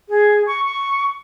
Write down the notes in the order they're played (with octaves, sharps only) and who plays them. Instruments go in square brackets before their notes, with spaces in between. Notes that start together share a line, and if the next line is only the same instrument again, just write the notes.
[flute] G#4
C#6
C#6